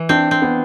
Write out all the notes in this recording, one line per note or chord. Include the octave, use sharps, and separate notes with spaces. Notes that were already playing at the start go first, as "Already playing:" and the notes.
Already playing: E3
C4 D4
C4
B3